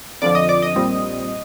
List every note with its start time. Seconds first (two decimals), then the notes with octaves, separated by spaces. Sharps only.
0.22 F2 D3 F3 D5 D6
0.35 D#5 D#6
0.49 D5 D6
0.62 D#5 D#6
0.76 A#1 A#2 G3 C4